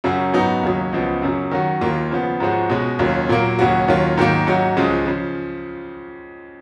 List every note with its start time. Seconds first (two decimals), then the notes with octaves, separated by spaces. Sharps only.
0.04 F#2 C#3 F#3 C#4 F#4
0.34 G#2 F#3 B3 D#4 F#4
0.63 D#2 C#3 F#3
0.93 C#2 C#3 F3 B3
1.22 F#2 C#3 F#3
1.51 D#3 F#3 C#4 F#4
1.81 D#2 D#3 A#3 F4
2.11 C#3 F3 B3
2.40 G#2 F3 G#3 C#4 F#4
2.70 B2 G#3 C#4
2.99 D#2 C#3 F#3 C#4 F4
3.29 A#2 F#3 A#3
3.59 D#2 C#3 F#3 C#4 F#4
3.88 D#2 D#3 F#3 C#4 F4
4.17 G#2 D#3 F#3 A#3
4.47 G#2 F#3 C#4 F#4
4.77 C#2 C#3 F3 G#3
5.06 C#3 F3